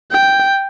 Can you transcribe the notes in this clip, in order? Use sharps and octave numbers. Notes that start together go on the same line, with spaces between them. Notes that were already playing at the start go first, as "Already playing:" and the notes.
G5